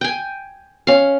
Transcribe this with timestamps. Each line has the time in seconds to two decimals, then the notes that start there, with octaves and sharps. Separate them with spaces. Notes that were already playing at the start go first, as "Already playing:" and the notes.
0.01 G5 G#5
0.87 C#4 F5